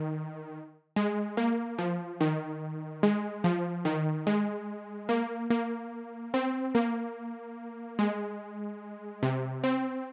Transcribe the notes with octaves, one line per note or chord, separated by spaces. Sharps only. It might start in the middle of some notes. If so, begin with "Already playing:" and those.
Already playing: D#3
G#3
A#3
F3
D#3
G#3
F3
D#3
G#3
A#3
A#3
C4
A#3
G#3
C3
C4